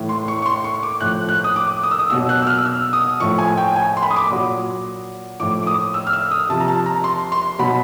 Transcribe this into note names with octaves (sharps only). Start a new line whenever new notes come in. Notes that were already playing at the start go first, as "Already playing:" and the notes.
Already playing: A2 E3
C6
C#6
C#6
C6
C#6
D6
A2 F3 F#6
F#6
D#6
D6
D#6
E6
D#6
B2 F#3 E6
F#6
E6
F6
E6
D#6
A2 F3 C#6
G#5
G5
G#5
C6
B5
D#6
D6
A#2 F#3
A2 F3 D6
D6
D#6
E6
F6
E6
D#6
C3 F3 A5
A#5
A5
A#5
C6
C6
B2 F#3 B5